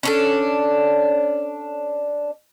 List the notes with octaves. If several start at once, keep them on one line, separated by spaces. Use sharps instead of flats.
C#4 D4 A4